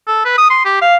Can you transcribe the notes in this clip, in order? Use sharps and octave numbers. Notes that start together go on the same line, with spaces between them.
A4
B4
D#6
C6
G4
F5